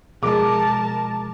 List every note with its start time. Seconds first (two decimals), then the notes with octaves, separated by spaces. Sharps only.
0.23 B2 F3 G#3 G#4 A#4 A5 D6